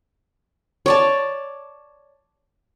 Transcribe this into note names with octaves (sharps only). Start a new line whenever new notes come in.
C#5 D5 A5